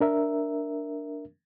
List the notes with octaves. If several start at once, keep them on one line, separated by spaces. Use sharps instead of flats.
D4 A#4 E5